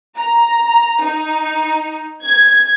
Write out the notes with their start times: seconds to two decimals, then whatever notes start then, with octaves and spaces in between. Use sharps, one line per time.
0.17 A#5
1.02 D#4
2.23 G#6